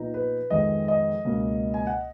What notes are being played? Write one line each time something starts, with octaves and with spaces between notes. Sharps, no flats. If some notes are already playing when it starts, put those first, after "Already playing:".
Already playing: A#2 F3 B3 D#4
B4
F2 D#3 G#3 B3 D#5
D#5
C#2 B2 A#3 C#4
G#5
F#5